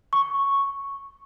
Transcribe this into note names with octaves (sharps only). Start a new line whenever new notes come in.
C#6